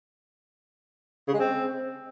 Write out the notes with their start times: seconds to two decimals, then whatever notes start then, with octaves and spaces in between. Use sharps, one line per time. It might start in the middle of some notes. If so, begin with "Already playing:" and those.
1.28 C#3
1.34 G#3
1.40 C4